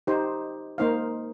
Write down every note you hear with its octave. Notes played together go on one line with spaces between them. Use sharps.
D#4 G4 C5
A#3 D#4 C5 F5